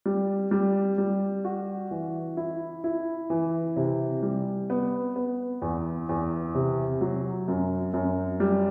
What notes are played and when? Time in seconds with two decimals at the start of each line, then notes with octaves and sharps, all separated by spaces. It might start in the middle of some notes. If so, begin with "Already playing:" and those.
0.06 G3
0.51 G3
0.98 G3
1.45 F#4
1.91 E3
2.37 E4
2.84 E4
3.30 E3
3.76 C3
4.23 G3
4.70 B3
5.16 B3
5.62 E2
6.09 E2
6.55 C3
7.01 F#3
7.48 F#2
7.94 F#2
8.40 G3